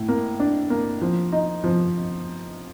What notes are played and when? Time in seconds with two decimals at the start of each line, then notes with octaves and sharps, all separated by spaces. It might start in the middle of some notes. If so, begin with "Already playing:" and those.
Already playing: A2
0.09 A#3
0.40 D4
0.70 A#3
1.01 F3
1.32 D#4
1.64 F3